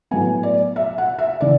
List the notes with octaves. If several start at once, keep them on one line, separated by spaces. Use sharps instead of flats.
A2 F#3 B3 G#5
D5
E5
F#5
E5
C#3 E3 D5